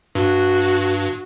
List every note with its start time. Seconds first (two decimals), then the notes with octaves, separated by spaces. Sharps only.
0.15 G2 F#4